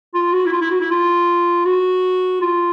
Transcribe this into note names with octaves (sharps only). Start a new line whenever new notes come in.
F4
F#4
E4
F4
E4
F#4
E4
F4
F#4
F4